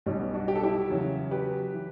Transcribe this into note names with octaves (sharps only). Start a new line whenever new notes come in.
B1 B2 G3 C#4
B3
D4 F#4
G4
A4
E4 G4
E2 C#3 F#3
G4 B4
E3